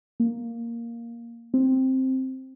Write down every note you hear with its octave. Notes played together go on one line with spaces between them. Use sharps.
A#3
C4